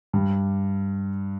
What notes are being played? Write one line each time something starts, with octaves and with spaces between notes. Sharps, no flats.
G2 G3